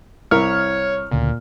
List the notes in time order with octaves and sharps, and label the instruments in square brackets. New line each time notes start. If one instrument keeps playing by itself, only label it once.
[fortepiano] C2 E4 A#4 [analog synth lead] C#5 [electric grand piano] F6
[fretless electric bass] D2 C#3 [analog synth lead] A#2